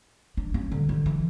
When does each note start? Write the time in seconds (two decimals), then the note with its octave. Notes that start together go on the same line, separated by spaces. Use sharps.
0.37 D4
0.54 C#4
0.72 D3
0.89 D3
1.06 E3